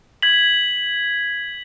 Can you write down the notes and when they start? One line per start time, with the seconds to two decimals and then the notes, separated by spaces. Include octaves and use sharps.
0.22 G#6 B6 F#7